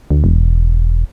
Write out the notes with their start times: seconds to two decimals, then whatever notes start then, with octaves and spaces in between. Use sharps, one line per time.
0.10 D2
0.24 E1